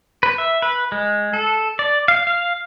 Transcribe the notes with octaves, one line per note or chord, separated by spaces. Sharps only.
B4
E5
B4
G#3
A4
D5
F5
F5